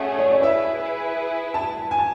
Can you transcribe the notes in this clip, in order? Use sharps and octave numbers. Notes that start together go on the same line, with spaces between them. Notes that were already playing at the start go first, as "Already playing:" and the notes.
Already playing: A3 C#4 G#4 E5 F#5
C#5
D5
E4 G#4 B4 E5
A5
G#5
A5